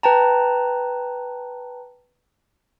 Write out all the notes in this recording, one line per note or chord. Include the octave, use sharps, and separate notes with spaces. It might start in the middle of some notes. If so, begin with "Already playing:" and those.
B4 G5 A5 A#5